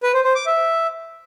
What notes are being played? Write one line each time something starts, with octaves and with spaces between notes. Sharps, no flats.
B4
C5
C5
D6
E5